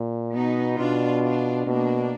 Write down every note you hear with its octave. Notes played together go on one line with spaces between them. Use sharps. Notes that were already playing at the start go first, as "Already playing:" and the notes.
Already playing: A#2
B2 B3 D#4
B2 D4 F4
D4 F4
B2 A#3 D4